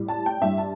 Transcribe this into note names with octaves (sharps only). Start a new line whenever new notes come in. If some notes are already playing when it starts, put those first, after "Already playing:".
Already playing: A2 G3
A5
G5
G2 G3 E5
A5